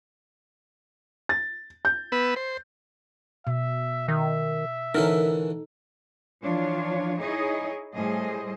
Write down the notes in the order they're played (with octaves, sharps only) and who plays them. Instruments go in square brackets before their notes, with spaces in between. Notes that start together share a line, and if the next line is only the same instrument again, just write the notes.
[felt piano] A6
G6
[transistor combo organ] B3 B4 E6
C5
[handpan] B2 [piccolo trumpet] E5
[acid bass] D#3 [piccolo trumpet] E5
[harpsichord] D3 E3 C#4 [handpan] D#4 A4 [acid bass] A#4
[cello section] E3 F3 D4 F4 C#5
D#4 E4 G#4 C#5 D#5
A2 G3 G#4 C5 D#5